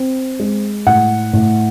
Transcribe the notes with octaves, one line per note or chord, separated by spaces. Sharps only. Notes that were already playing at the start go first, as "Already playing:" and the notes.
Already playing: C4
G#3
A2 F#5
A2